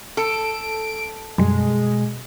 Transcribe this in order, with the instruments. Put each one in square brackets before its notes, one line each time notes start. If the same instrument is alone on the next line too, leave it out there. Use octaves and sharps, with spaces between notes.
[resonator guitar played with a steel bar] A4 [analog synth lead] D7
[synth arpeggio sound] F#2 G3 [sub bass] B2 [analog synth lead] G#3